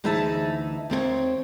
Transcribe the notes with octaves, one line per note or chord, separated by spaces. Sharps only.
D2 E3 D#4 G#4 E5 A5
D#2 C4 G#4 C#5